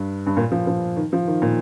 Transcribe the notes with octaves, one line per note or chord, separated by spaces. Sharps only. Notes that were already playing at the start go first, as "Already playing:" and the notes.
Already playing: G2
G2
A#2
F3
F3
D#3
F3
D#3
A#2